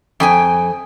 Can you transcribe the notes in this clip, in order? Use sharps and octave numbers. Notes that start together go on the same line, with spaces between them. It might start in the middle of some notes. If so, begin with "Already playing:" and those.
F2 G5 G#5